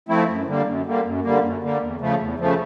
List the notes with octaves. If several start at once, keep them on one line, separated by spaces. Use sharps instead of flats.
F3 A3 C4 E4
F#2
D3 G3 A#3
F#2
D3 G3 A#3
F#2
D3 G3 A#3
F#2
D3 G3 A#3
E2
C#3 F3 A3
E2
C#3 F3 A3